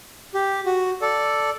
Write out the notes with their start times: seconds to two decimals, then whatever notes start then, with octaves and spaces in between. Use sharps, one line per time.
0.34 G4
0.66 F#4
1.02 A4 D5